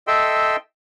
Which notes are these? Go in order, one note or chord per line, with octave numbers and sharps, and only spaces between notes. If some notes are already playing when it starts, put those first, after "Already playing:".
A4 D#5 E5 G5 C6 E6